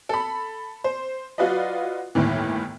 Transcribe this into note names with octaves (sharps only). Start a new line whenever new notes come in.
A4 B5
C5
F#3 F4 F#4 B4 D5 D#5
G1 D#2 A2 D#3 E3